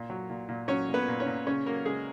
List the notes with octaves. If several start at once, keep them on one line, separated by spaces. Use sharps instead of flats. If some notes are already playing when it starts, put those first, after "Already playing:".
Already playing: A#2
F#3
A#2
A#2
F#3 C#4 C#5
A#2
B3 B4
A#2
C#4 C#5
A#2
C#3 C#4 C#5
F#3 A#3 A#4
C#3 G#3 G#4